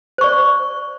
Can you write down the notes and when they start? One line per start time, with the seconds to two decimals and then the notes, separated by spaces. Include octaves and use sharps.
0.18 C5
0.21 C#6
0.24 D5